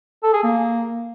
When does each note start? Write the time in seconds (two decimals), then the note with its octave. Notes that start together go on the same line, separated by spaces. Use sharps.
0.23 A4
0.33 G#4
0.44 A#3